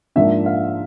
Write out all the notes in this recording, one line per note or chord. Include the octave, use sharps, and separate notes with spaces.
G#2 F3 A#3 D4 E5
F5